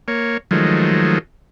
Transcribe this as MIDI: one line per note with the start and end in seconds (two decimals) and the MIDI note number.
0.08 0.37 58
0.08 0.37 73
0.51 1.18 51
0.51 1.18 53
0.51 1.18 54
0.51 1.18 56
0.51 1.18 57